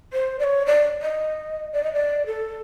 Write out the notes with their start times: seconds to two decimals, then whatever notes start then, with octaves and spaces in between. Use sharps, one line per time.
0.13 C5
0.39 D5
0.44 C#5
0.66 D5
1.02 D#5
1.73 D5
1.83 D#5
1.93 D5
2.26 A4